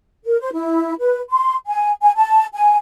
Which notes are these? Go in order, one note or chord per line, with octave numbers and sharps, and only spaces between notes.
A#4
C5
E4
B4
C6
G#5
G#5
A5
G#5